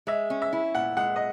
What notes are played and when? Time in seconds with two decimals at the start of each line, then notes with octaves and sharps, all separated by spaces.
0.07 G#3 E5
0.30 C#4
0.42 E5
0.53 E4
0.75 A#2 F#5
0.97 G#3 F#5
1.16 D#5